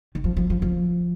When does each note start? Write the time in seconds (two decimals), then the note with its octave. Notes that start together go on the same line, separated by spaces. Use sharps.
0.15 D#3
0.24 F3
0.37 F3
0.50 F3
0.62 F3